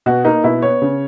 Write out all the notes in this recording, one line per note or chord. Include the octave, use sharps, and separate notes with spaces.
B2 F#4
A#3 D#4
B2 E4
B3 C#5
C#3